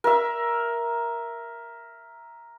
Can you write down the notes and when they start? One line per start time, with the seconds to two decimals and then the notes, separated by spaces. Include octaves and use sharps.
0.04 A#4 E5